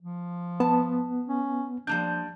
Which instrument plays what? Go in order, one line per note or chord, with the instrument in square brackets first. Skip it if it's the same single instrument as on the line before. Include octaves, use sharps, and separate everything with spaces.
[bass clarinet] F3
[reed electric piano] B3 [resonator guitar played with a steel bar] A5
[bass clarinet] C#4
[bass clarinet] F3 [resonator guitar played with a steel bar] G3 A#3 D4 [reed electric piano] G6